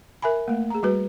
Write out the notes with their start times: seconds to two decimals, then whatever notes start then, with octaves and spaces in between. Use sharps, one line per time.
0.22 A#4 E5 G#5 B5
0.48 A3 A#3
0.70 G#4 A#5
0.83 G3 F#4 B4